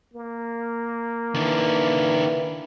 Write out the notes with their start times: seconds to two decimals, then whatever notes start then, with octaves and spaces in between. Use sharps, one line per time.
0.14 A#3
1.34 D#3 E3 D4